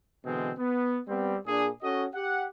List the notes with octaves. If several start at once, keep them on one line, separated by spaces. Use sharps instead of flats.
B2 D3 E3 G#3 C4
B3
G3 B3 C4
A#2 D4 G#4
C#4 F#4 A4 D#5
G4 F#5